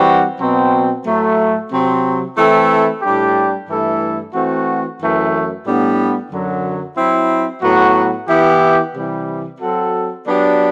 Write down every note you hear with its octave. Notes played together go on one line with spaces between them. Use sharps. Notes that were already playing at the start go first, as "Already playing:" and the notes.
Already playing: E3 G3 C4 F#4
B2 F#3 C4
A2 F#3 A3
C3 F#3 C4
E3 A3 C4 E4 A4
A2 G3 D4 G4
G2 E3 A3 E4 A4
E3 A3 C4 F#4
F#2 E3 A3
A2 G3 B3 D4
F#2 D3 F#3
F#3 C4 E4
A2 F#3 B3 F#4
E3 B3 E4 G4
C3 E3 G3
F#3 C4 F#4 A4
F#3 B3 D4 G4